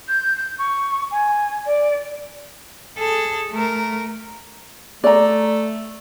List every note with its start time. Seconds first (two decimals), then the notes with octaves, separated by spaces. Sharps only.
0.08 G6
0.36 G6
0.58 C#6
1.11 G#5
1.66 D5
2.98 G#4 A4
3.51 A3 A#4
5.04 A3 D5 A#5